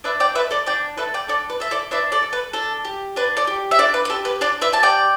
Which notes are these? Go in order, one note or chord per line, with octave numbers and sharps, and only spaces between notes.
D4 B4 E5
D5 G5
A4 B4 E5
A4 D5
D4 D5 G5
A4 B4 E5
D5 G5
D4 A4 D5
B4
A4 E5
A4 D5
D4 B4 E5
A4 D5
A4
B4
D4 A4
G4
D4 B4
A4 D5
G4
E5
D4 A4 D5
B4
B4
G4 A4
B4
D4 A4 D5
B4 E5
G4 A5
D5 G5